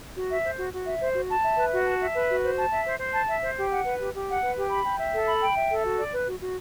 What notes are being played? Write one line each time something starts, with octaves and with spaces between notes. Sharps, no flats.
F#4
E5
C5
F#4
F#4
E5
C5
F#4
A5
E5
B4
F#4
A5
E5
B4
F#4
C5
A5
E5
C5
C5
A5
E5
C5
G4
F#5
B4
G4
G4
F#5
B4
G4
B5
G5
E5
A4
B5
G5
E5
A4
F#4
D5
B4
F#4
F#4